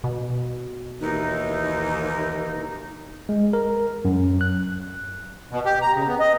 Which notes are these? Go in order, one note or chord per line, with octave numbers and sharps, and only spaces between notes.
B2
D#2 E3 D#4
G#3
A#4
F#2
F#6
B2
G4
A#5
C#3
B3
D#5